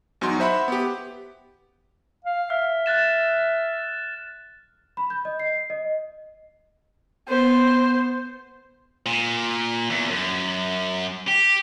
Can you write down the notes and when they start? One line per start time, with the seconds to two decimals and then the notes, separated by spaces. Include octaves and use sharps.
0.21 E2 F#3 D#4 C6
0.40 C5 E5 F#5 B5
0.68 B3 G4
2.24 F5
2.50 E5 F6
2.86 F#6 A6 E7
4.97 B5
5.10 G6
5.25 D#5
5.40 C7
5.70 D#5
7.28 B3 C5
9.06 A#2
9.90 E2
10.11 F#2
11.27 G4